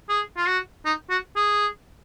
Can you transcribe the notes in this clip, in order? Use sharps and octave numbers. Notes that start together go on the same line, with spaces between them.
G#4
F4
F#4
D#4
F#4
G#4